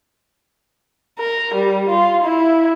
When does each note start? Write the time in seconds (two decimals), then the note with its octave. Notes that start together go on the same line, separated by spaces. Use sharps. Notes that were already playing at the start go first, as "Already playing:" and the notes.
1.19 A#4
1.55 G3
1.90 F4
2.24 E4